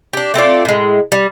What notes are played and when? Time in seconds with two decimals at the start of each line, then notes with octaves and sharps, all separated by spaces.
0.13 D4 G4
0.34 A3 C4 F4 D5
0.65 A2 G#3
1.12 G3